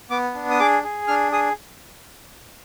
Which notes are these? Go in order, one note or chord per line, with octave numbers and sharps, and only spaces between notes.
B3 D6
D4
D#6
G#4 D6
G#4
D4 F6
G#4 D#6